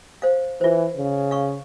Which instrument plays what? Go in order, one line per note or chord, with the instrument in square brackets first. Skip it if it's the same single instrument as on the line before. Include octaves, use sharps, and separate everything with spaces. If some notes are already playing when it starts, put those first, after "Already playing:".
[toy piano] C5 F5
[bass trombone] E3 [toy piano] F4 C5
[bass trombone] C#3
[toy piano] F5 C#6